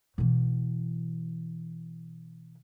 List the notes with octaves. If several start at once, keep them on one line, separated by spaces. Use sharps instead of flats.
B2 E3